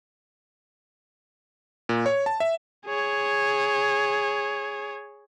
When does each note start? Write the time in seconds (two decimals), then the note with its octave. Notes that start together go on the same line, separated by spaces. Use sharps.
1.89 A#2
2.06 C#5
2.26 A5
2.40 E5
2.86 G#4 C#5